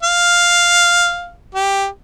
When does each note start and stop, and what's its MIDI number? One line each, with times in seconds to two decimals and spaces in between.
0.03 1.32 77
1.55 1.86 67